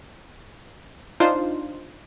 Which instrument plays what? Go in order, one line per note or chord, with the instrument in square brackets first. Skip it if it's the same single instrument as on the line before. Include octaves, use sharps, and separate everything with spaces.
[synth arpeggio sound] D4 D#4 F4 C5